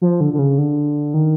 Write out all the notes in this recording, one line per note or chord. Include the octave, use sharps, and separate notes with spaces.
F3
D3
D3
C#3
D3
D#3